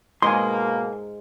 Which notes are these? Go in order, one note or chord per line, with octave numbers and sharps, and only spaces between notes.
G#2 B2 G#3 A#3 D#5 G#5 C6